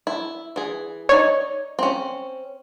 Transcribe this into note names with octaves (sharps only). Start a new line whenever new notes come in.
E4
E3 G#4
D#4 C#5 D5
C4 C#4